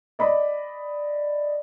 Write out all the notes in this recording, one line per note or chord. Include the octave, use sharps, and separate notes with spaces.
D5 D#5 B5